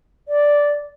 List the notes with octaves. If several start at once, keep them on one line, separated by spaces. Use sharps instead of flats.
D5